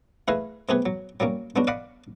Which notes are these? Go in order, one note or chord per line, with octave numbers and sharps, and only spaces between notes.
A3 E4 G#4 B4 D#5 F5
C3 A3 B3 G4 G#4 B4
F#3
F#3 G3 A#3 C#4
G#3 B3 C#4 D4 F#4
D5 D#5 F5 F#5 B5